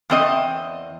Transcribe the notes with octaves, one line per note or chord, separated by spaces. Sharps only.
E2 C4 D#5